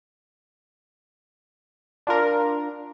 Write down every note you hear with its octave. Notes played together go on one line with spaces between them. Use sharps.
D4 F4 A#4